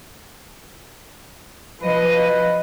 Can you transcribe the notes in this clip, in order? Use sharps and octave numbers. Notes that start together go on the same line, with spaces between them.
F3 B4 D#5